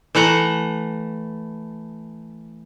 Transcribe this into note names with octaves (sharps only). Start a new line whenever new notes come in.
E3 A3 F#5 A#5